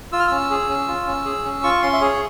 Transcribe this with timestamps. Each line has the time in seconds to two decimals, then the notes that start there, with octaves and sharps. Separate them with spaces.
0.12 F4 E6
0.20 F6
0.28 C#4 E6
0.50 G#4
0.69 C#4
0.88 F4
1.07 C#4
1.25 G#4
1.44 C#4
1.63 F4 C#6
1.82 C#4 C6
1.93 E5
2.01 G#4 C#5